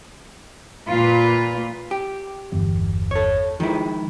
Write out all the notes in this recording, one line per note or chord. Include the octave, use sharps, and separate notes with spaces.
A#2 F4 B4
G4
G1 E2
A4 C#5
D#3 F3 G#3 E4